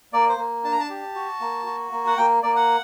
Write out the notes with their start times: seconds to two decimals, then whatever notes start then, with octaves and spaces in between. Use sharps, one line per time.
0.13 A#3 D5
0.29 C5
0.38 A#3
0.64 D4 A5
0.72 A#5
0.80 A5
0.89 G4
1.15 F#4
1.40 A#3
1.66 F#4
1.92 A#3
2.07 F#5
2.17 A#3 G5
2.43 A#3 D5
2.56 F#5